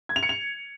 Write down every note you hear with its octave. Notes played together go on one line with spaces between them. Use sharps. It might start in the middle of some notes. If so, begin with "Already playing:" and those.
G#6
F7
C#7
F7